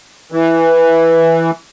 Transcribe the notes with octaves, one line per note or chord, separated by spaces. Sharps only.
E3